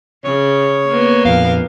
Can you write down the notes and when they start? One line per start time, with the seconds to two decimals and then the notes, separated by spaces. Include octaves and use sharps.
0.24 C#3 C#5
0.86 A#3 B3
1.25 F2 A#2 F5